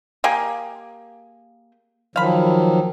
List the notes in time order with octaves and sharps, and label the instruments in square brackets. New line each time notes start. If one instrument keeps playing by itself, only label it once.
[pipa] A#3 G4 G#4
[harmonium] D#3 F3 F#3 [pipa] F5 B5